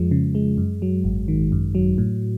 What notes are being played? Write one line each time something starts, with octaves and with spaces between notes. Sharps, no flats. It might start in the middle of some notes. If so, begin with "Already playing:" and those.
Already playing: F2 F3 G#3
C#3
G#3
F#2
F#3
G#1
D#3
F#2
F#3
A2